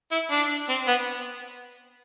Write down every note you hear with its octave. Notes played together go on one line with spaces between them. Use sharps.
E4
D4
C4
B3